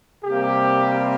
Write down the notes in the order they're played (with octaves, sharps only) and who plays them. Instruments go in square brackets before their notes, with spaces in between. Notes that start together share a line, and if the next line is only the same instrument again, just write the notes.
[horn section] C3 G3 A#3 G4